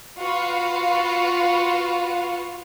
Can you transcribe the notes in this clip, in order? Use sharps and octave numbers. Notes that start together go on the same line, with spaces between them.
F4 F#4 B4 F5